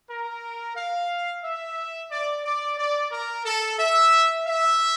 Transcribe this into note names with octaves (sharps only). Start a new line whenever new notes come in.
A#4
F5
E5
D5
D5
D5
A#4
A4
E5
E5